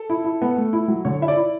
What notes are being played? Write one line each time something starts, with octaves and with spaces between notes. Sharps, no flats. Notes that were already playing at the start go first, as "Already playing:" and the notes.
Already playing: A4
E4
E4
B3
A3
E4
F#3
D3 C#5
E4 E5
D5
E4